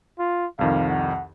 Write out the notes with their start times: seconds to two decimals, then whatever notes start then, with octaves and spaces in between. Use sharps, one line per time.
0.19 F4
0.59 C2 F2 D#3 F5
0.89 F#5